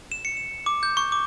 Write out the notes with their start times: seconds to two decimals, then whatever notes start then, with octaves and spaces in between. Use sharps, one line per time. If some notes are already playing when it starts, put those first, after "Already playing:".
0.12 E7
0.25 C#7
0.37 E7
0.66 D6
0.83 G6
0.97 C#6
1.12 D6